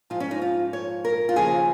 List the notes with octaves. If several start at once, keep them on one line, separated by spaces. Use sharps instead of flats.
G#2 F3 F4
C#4
D#4
F4
C#5
A#4
F4
D#2 C#3 F3 G#4